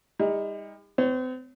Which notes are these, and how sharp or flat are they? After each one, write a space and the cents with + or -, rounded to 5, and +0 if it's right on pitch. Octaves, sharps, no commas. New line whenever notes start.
G3 +45 D#4 +25
C4 -40 C#5 -5